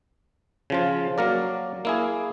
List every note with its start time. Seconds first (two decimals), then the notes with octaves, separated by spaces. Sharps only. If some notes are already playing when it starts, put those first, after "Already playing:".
0.70 C#3 F3 F4
1.18 F#3 A#3 A#4 D5
1.85 A#3 E4 G#4